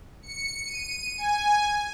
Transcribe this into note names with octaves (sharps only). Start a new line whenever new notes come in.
C#7
D#7
G#5